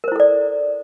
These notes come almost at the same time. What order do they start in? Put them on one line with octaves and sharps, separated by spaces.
A#4 C5 E4 A4 D5